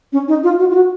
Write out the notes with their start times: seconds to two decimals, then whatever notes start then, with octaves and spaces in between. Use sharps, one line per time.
0.13 C#4
0.28 D#4
0.44 F4
0.59 F#4
0.71 F4
0.75 F#4